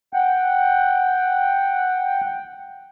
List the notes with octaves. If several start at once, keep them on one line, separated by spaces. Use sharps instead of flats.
F#5 G5